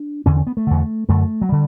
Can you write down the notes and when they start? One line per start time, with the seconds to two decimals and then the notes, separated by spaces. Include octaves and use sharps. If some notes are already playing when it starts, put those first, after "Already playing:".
Already playing: D4
0.26 E2 D3 C#4
0.37 C#4
0.47 B3
0.57 A3
0.67 E2 D3
1.09 F#2 D3 A3
1.42 F#3
1.49 D3 G3